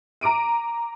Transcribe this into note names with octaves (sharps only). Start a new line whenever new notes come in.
A#5 D6 D7 D#7